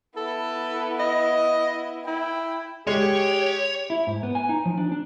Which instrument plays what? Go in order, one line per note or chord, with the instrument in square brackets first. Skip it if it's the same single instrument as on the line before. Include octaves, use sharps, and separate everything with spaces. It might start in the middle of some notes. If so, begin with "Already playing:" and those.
[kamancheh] B3 E4 [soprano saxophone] A4
[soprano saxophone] D#5
[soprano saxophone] E4 [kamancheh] G5
[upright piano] G#3 [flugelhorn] G4 [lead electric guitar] C#5
[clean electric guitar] E4
G#2
B3
G#5
D#4
F3
D4
D4